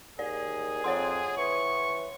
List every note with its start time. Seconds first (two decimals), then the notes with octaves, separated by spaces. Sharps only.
0.19 D#2 G#4 D5
0.84 F2 C#5 F#5 C6
1.37 E3 C#6